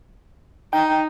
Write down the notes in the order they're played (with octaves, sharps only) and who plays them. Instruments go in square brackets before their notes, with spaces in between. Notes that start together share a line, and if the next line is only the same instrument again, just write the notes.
[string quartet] D#4 [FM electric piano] G5